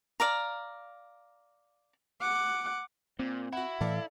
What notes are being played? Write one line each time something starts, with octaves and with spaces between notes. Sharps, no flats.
D5 F5 A#5
F#5 D6
A#2 C4
E4 F#4 F#5
A2 E3 A4 D5 F5